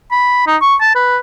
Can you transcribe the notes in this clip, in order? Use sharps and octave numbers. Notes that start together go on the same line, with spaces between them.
B5
D#4
C#6
A5
B4